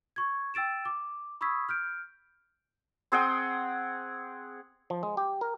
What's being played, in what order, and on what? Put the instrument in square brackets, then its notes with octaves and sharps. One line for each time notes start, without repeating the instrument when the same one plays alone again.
[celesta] C#6 G#6
G5 E6 A6 D7 E7
D6
B5 C#6 D#6 E6 G#6 B6
F6 G6 D7
[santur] C4 G#4 F#5 G5
[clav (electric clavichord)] F3
G#3
G4
A#4